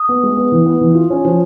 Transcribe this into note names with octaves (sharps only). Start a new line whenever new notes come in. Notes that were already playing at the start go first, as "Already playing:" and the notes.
Already playing: D#6
B3
G#3
B3
E3
B3
E3
F4
C#4
F3